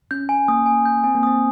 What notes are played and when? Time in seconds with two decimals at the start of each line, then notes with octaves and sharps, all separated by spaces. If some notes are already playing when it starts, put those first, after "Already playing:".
0.11 C#4 G6
0.29 G#5
0.48 A#3 D#6
0.66 G#5
0.86 G6
1.04 C4 G#5
1.15 A#3
1.23 C4 D#6